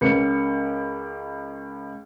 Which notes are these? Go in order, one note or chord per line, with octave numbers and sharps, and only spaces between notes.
C#2 A#3 C#4 A#4 C#7